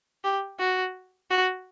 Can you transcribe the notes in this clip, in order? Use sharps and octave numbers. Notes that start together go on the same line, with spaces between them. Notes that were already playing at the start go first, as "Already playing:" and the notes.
G4
F#4
F#4